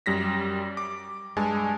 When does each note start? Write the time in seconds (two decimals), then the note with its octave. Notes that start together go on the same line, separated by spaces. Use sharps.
0.06 F#2 G3 A#6 B6
0.77 D6
1.37 G2 G#3 G#5 A5